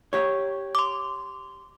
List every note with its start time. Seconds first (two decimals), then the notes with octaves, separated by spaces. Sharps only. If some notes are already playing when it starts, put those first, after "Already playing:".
0.13 G4 C#5
0.75 C6 D6